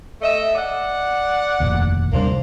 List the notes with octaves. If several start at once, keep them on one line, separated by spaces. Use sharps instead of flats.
A3 D#5 E5
D5 F#5
F1 A#1 D#2
D#2 C3 G3 A#3 D4 C5